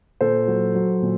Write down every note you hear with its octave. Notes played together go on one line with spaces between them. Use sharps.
A#2 A4 C5
F#3
F#3
A#2